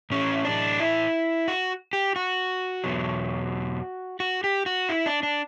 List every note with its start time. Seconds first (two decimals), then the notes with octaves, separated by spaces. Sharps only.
0.10 A2 E3 C#4
0.45 D4
0.80 E4
1.48 F#4
1.93 G4
2.16 F#4
2.84 E2 B2 F#3
4.20 F#4
4.44 G4
4.66 F#4
4.89 E4
5.06 D4
5.23 D4